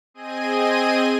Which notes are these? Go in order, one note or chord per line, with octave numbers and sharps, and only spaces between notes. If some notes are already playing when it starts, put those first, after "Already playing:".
C4 G#4 D#5 G#5 D#7